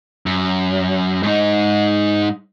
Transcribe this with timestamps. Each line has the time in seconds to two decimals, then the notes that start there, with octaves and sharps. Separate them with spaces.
0.26 F#2
1.23 G#2 D#4